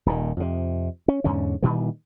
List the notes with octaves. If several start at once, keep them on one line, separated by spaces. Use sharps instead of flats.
D#1 A#2 D#3
F2 C3
C#4
E2 G#2 D3 C#4
A#2 D#3 E3 G3